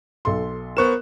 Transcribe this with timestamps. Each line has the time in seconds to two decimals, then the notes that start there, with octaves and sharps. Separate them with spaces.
0.25 B1 A4 C6
0.77 B3 A#4 C5 C#6 F#6 E7